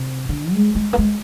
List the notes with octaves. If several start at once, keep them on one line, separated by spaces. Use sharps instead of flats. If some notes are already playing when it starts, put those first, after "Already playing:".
Already playing: C3
D3
G#3
G#3
A#3
G#3